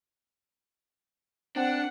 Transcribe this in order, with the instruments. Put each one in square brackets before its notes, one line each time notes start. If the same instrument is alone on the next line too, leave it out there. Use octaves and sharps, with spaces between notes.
[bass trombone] C4 [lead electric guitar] D4 [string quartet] F#5